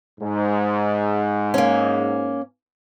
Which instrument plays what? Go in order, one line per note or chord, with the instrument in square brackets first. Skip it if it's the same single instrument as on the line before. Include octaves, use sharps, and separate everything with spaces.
[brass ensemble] G#2
[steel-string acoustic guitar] A#3 C#4